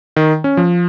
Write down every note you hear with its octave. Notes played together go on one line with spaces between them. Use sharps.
D#3
C#4
F3